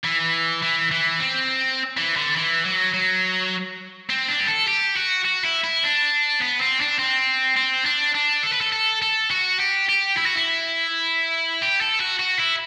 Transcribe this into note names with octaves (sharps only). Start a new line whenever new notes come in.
E3
E3
E3
C4
E3
D3
E3
F#3
F#3
C4
D4
G4
A4
G4
F#4
F#4
E4
E4
D4
B3
C4
D4
C4
C4
D4
D4
A4
B4
A4
A4
A4
F#4
G4
G4
E4
F#4
E4
G4
A4
F#4
F#4
E4